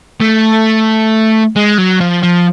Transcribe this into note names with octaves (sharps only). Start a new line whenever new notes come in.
A3
G#3
F#3
F3
F3